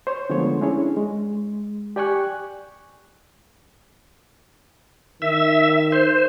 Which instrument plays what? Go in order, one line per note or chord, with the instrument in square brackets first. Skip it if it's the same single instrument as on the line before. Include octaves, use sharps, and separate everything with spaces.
[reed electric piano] C5 C#5 C6
D3 F3 G#3 A3 B3 C#5
C#4 D4 E4 G#4 C#5
G#3
G4 D5 G5 G#5 C#6 F#6
[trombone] D#3 [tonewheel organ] E5
[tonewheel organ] C5